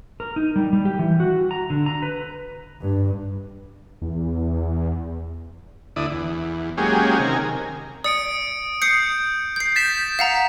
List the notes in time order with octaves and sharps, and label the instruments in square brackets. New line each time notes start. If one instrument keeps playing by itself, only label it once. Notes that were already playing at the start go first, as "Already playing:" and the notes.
[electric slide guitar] A#4
D#4
G3
G3
G4
E3
F#4
A#5
D3
A#5
B4
[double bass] G2
[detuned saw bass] E2
[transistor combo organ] D2 E4 D5 D#6
E2
F#3 G#3 A#3 C#4 G4 G#4
C3 D#3 A#4 G#5
[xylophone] D5 [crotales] D#6 C#7 D7
[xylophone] D#6 C7 C#7 [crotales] G6
[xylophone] G6 C7
[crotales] A6 B6 E7
[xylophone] F5 F#5 A#5